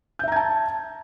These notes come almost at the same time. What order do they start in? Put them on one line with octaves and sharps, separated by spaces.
G6 E5 A#5 G#6 A5